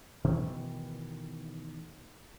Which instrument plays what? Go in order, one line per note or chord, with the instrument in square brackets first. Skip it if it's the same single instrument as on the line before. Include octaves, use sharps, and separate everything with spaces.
[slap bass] B2 D#3 E3 A3